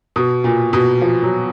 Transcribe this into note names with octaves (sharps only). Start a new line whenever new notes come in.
B2
A#2
B2
F3
F#3